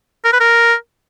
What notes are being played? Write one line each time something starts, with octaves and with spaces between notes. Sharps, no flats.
A#4
B4
A#4